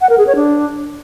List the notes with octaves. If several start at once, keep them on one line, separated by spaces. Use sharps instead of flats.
F#5
A#4
G#4
C#5
D4